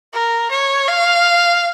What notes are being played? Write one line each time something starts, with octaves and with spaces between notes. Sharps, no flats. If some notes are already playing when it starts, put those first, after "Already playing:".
A#4
C#5
F5